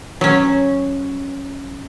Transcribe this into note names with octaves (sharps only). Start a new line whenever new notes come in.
F#3 C#4